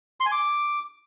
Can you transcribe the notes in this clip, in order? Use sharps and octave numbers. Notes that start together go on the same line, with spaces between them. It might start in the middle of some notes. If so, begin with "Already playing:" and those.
C6
G#5
D6